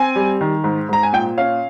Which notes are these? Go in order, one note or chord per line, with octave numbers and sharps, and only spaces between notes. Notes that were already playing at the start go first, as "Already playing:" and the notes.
Already playing: C4 G#5
G3
D#3
G#2
G#2 A#5
G#5
A#2 G5
C#4 F5